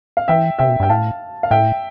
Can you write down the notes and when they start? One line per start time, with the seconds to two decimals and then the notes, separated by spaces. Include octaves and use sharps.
0.17 F5
0.28 E3 E5 G5
0.59 C3 E5 G5
0.69 B2
0.80 G2
0.83 G5
0.89 A2 F5 A5
1.43 F5
1.51 A2 E5 G5